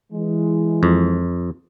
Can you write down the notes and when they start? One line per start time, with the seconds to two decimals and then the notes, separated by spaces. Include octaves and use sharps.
0.13 E3 G#3
0.83 F2